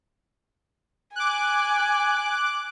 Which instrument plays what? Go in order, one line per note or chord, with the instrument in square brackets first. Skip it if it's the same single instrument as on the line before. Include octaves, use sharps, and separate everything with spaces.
[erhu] G#5 [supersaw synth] D6 F#6